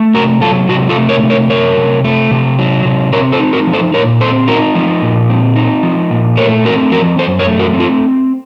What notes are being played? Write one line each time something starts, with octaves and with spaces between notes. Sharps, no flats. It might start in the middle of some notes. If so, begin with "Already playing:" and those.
Already playing: A3
C3 F#4 A#4
F#3 F4 A4
C3 F#4
F4 A4
A3
A#4 C#5
C3
A#4 C#5
F#3 A#4 C#5
C3
A3
C3
F#3
C3
C4 A#4 C#5
A4 C5
D#4
F#4 A#4
F3
A4 C5
A#2 A#4 C#5
C4 A4 C5
D#4 F#4 A#4
F3
A#2
C4
D#4
F3
A#2
A3 A#4 C#5
C4 F#4 A#4
F3 F#4 A#4
F#2 A4 C5
A#4 C#5
A3
F#4 A#4
C4
F4 A4